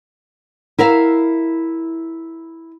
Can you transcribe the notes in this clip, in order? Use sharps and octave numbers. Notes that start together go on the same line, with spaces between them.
E4 A#4 E5 F5